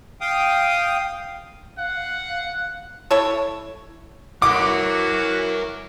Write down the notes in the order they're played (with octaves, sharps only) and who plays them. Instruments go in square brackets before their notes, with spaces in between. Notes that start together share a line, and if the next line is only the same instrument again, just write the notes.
[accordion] F5 G5 D#6
[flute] F5 [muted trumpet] F#5
[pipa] E4 A4 C#5
[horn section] E3 F#3 F#4 [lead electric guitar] A#4 F#5 [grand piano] D6